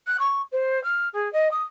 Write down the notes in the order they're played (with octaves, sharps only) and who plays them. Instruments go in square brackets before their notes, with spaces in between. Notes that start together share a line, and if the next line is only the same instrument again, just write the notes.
[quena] F#6
C#6
C5
F6
G#4
D#5
D#6